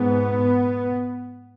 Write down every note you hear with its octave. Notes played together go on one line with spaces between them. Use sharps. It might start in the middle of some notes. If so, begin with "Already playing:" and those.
Already playing: G#2 B3